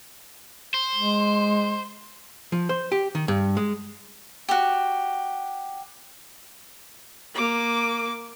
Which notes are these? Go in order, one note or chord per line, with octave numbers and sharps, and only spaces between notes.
C5
G#3
F3
C5
G4
D#3
G2
G#3
F#4 G4
A#3 D6